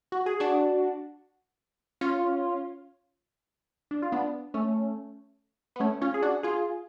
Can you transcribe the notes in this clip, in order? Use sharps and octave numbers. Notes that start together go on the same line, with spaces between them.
F#4
G#4
D4 F#4
C#4 F4
D4
F4
B3 D4
A3 C#4
B3
A3 C#4
C#4 F4
G#4
D4 F#4
F4 G#4